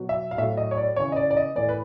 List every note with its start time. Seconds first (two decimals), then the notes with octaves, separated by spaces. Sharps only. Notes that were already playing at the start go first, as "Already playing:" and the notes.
Already playing: B2 F#3
0.09 E5
0.31 F5
0.38 A2 F#3 E5
0.57 D#5
0.71 C#5
0.77 D5
0.96 C#3 E3 C#5
1.12 D#5
1.16 D5
1.31 D5
1.37 D#5
1.56 A2 E3 D5
1.69 B4